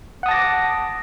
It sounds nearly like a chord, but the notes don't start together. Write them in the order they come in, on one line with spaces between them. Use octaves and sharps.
F#5 D#6 A5 A#6 D6